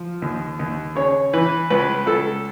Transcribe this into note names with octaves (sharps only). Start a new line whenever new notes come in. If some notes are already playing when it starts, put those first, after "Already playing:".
Already playing: F3
D#2
D#2
C#3 C#5
E3 B4
C#2 B4
C#2 A4